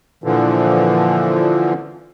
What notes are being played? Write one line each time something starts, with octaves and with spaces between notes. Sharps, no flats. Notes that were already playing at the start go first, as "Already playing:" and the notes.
A#2 D3 E3 F3